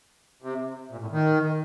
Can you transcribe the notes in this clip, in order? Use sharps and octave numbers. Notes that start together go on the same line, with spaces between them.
C3
A#2
A2
D#3